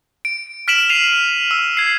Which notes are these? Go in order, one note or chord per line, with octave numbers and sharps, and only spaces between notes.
D7
F6 B6 D7 E7 F#7
C7 D#7 F7
E6
G#6 C7